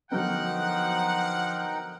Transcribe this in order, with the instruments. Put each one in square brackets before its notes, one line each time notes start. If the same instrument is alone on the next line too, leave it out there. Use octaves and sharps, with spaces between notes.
[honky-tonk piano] D3 F#3 B3 [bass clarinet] F3 [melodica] D#4 A#4 G5 [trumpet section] F#5